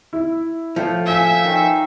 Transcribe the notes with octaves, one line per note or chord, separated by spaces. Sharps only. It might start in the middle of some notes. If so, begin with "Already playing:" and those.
E4
A2 F3
E5 F5 G#5
D#3